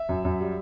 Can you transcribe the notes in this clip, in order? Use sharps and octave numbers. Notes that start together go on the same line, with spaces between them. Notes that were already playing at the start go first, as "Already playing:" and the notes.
Already playing: E5
F#2
F#2
G3